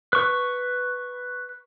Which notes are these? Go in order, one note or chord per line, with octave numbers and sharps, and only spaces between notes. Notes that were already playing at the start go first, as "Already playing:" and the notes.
B4 C#6